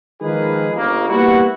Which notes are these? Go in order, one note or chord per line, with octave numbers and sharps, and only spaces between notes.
D#3 F3 G#3 A#3 G#4 B4
G1 C#3 A#3
G3 A#3 B3 E4 F#4